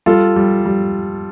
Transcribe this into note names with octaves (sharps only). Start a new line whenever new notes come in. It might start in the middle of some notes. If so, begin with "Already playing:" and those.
G3 F4 A4
G3
G3